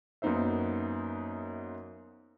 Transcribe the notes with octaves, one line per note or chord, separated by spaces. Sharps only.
F#2 A#3 B3 D#4 C5 E5